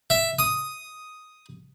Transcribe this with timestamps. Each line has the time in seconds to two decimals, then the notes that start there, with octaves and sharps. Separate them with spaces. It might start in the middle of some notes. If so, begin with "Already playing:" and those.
0.10 E5
0.39 D#6